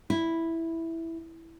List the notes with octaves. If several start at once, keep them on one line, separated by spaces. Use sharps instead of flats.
E4